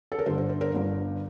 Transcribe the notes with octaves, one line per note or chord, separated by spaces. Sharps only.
A4
A#4
G1 G2 D3 C5
C5
C5
A#4
G1 G2 D3